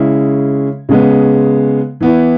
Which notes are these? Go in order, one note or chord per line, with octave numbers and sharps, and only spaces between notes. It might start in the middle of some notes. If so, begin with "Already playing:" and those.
Already playing: C#3 G#3 C#4 E4
C#3 G#3 B3
E3 B3 E4